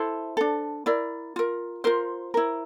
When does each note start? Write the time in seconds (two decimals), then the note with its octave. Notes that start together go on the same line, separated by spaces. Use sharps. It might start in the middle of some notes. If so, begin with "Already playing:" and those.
Already playing: E4 A4 C5
0.37 D4 A4
0.86 E4 A#4 D5
1.36 F4 A#4
1.84 F4 A#4 C5
2.34 E4 A#4